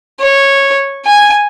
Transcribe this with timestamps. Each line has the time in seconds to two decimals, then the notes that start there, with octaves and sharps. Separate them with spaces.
0.20 C#5
1.06 G#5